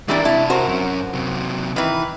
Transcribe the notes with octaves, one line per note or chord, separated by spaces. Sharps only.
E3 G3 G#3 D4 A#4
C3 E4 A5
F#4 A#4 C5
F#2 C#4
C3 F#3
D#3 E3 B4